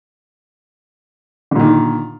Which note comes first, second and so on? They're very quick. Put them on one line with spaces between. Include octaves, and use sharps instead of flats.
D3 A#2 D#3